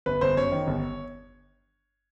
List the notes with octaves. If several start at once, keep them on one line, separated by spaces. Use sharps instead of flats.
G1 B4
G1 C5
F#2 C#5
D#3
G1